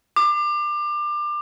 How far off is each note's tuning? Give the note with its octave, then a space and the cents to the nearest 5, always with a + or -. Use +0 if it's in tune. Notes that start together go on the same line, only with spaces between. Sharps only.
D6 +25